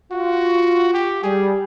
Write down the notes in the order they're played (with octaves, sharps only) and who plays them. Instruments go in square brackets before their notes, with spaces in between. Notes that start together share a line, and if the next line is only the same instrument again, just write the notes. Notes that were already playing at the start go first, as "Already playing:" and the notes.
[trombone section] F4 [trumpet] F#4
[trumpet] G4
[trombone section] G3 [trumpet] G#4